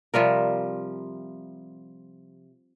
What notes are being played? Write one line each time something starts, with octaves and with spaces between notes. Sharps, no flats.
C3 F3 G3 A#4